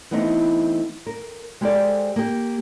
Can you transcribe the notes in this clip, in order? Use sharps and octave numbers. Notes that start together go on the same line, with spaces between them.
E3 A3 B3 C4 D#4
A#4
G#3 G4 A4 A#4 C5 D5
A#3 G4